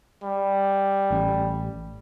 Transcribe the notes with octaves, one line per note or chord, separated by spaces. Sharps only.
G3
A1 C#4